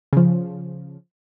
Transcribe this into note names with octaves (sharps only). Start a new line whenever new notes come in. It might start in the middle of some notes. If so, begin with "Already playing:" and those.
C#3 F3